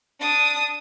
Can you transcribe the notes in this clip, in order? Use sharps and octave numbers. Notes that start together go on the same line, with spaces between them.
D4 D#6